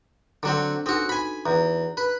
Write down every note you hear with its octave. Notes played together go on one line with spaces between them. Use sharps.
D3 F#3 C4 D4
C4 D#4 F#4 A4 B4
F#4 G#5 B5
E2 A#5
B4